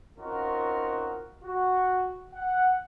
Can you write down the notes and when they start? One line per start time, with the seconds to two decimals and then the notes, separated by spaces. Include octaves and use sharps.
0.18 C4 C#4 D#4 F4 F#4 A#4
1.43 F#4
2.34 F#5